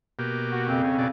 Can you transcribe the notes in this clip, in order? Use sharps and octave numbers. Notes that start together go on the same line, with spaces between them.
B2 A#3 G4
F#4
F2 C#3 C4
C#4
B2 C#4 D5